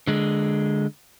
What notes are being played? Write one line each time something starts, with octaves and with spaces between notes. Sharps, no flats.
D3 G#3